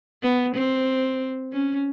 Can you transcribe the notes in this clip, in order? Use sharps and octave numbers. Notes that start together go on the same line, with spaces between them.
B3
C4
C#4